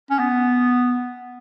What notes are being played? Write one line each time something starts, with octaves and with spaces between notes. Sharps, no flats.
C#4
B3